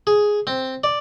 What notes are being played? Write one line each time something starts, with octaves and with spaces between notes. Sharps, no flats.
G#4
C4
D5